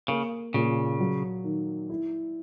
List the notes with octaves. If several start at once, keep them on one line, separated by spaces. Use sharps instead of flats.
C#3 A#3
A#2 C#3
F#3
D#3
E4